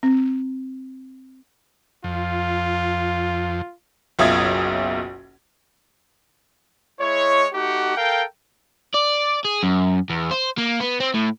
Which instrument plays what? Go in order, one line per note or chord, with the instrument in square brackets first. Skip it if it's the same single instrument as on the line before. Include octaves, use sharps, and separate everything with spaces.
[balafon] C4
[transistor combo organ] F2 [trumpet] F4
[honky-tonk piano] F#1 B1 F4 E5 D#6 G#6
[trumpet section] G#3 E4 C#5
A3 D#4 F#4 G4 F#5
A4 A#4 F5 G5
[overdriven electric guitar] D5
G#4
F#2
E2
C5
A#3
B3
C4
A2